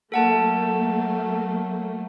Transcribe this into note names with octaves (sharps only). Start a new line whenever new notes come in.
F#3 A3 A#3 A4 F#5 A5